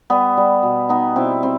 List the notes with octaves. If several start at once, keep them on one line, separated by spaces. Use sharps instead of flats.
G3 B3
G3
B2
G3 B3 D#4
B2 C4 E4
G3 C4